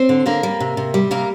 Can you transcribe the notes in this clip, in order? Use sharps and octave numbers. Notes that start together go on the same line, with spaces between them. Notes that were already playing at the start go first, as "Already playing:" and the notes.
Already playing: C4 C5
D3
D3 A#3 A#4
G3
C3
C3
G3
C3 A#3 A#4